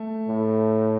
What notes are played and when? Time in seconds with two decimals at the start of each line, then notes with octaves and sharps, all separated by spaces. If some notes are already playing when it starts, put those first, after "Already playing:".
Already playing: A3
0.28 A2